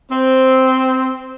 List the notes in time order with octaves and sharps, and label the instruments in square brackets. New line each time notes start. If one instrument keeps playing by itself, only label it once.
[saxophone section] C4